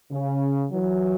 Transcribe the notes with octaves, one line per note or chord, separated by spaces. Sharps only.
C#3
E3 F#3